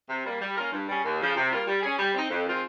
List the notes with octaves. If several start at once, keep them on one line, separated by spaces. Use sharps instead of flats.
C3
G3 A#3
G3
A#3 C#4 F4 A#4
G2
G3 C#4 G#4
D#2
C#3 F3
C3
G3 A#3 F4
G3
C#4 G#4
G3
C4 D#4
F2
D#3 G#3 C4 F4